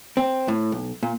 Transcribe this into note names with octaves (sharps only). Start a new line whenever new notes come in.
C4
A2
B1
A#2